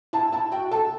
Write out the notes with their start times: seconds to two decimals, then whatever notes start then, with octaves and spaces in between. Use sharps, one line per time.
0.13 E4 A5
0.33 E4 A5
0.52 F#4 G5
0.71 A4 A5